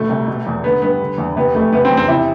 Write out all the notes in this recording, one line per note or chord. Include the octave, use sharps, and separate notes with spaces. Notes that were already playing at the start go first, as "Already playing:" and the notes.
Already playing: D2 B2 A3
C2
B2
E2
D3 B3
G2 B3
D3
E2
C3 B3
F2 A3
C3 B3
C4
E2
C4
C3 E4